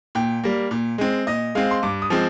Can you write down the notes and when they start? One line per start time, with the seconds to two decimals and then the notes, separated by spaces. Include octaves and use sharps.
0.15 A#2 G5
0.44 G3 A#3
0.71 A#2
0.98 G#3 C4
1.27 A#2 D#5
1.55 G#3 C4 F5
1.71 C6
1.83 G2 D6
2.02 D#6
2.10 F3 G#3 C4